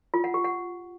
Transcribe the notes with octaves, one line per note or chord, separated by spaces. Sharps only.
F4
F#5
G4
F#5